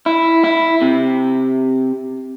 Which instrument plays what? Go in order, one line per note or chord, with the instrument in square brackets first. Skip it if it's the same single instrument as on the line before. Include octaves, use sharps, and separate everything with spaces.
[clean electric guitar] E4
E4
C3